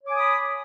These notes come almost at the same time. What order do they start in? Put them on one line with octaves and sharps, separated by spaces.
C#5 D6 G#5 D#6 B5